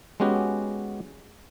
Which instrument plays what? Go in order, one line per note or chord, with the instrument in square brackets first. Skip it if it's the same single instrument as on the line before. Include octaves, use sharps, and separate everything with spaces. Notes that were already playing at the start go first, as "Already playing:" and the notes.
[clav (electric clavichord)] G#3 B3 C#4 F#4 G4